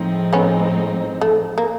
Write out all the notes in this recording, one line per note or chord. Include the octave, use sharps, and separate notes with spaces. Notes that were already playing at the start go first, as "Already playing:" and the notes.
Already playing: A2 F3 G#3 C4 D#4
B3 C#4
A3
A#3